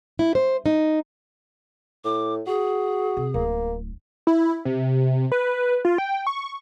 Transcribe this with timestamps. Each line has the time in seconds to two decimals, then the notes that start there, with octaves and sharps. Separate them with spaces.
0.19 E4
0.35 C5
0.66 D#4
2.05 A2 D6
2.47 F#4 G#4
3.17 C3
3.34 D1 A#3
4.27 E4
4.65 C3
5.32 B4
5.85 F4
5.98 G5
6.27 C#6